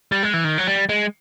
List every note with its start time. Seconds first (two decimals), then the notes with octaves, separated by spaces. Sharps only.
0.12 G3
0.23 G#3
0.34 E3
0.44 D#3
0.58 F#3
0.67 G3
0.89 G#3